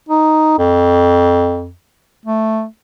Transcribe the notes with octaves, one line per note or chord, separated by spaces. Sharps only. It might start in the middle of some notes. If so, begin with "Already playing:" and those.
D#4
F2
A3